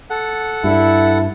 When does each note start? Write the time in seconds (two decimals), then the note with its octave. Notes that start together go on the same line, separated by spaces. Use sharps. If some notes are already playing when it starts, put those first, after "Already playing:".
0.10 A4 F#5
0.64 G2 E4